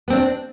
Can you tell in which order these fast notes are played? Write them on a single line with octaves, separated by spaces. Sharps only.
B3 C4 D4